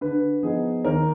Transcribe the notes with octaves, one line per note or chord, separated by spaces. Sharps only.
D3 B4
F3 B3 D#4 G#4
D#2 A#4